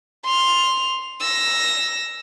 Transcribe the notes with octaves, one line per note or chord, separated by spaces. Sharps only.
C6 F7
E6 A#6